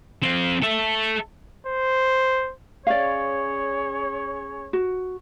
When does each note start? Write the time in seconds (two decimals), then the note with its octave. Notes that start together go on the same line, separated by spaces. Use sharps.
0.22 F3 C4
0.62 A4 E5
1.66 C5
2.87 C#4 G#4 C#5 D5 F5
4.73 F#4